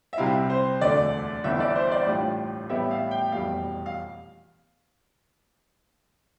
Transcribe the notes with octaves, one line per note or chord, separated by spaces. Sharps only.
E5
C2 C3 G3 C4 E4 F5
C5
E1 D2 D3 A3 D5
G1 G2 E3 B3 E5
D5
C5
D5
A1 A2 G3 D4 F4
A1 A2 G3 B3 E5
F5
G5
F1 E2 B2 G3 F5
F5